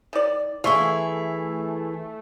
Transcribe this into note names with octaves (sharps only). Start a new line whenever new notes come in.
D#3 D5
E3 A3 G#4 E5 F5 C6 C#6